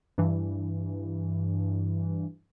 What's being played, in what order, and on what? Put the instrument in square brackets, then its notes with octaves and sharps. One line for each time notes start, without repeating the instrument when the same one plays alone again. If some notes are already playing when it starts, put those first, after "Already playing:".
[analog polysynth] G2 E3